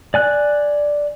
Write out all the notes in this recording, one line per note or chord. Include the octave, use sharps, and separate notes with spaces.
D5 G#5 F#6